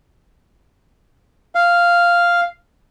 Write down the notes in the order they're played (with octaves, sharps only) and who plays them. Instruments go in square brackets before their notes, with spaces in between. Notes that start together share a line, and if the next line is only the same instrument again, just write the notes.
[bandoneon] F5